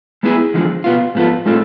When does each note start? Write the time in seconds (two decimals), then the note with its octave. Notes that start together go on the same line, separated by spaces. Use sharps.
0.23 G#3 B3 E4 G#4
0.54 E2 D3 F3 G#3
0.84 B2 B3 F4
1.15 G#2 F3 B3 F4 A4
1.46 A2 G#3 C4 F4 A4